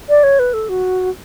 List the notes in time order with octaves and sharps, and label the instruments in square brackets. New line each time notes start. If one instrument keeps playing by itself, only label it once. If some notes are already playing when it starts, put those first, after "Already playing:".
[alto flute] D5
C#5
B4
A4
F#4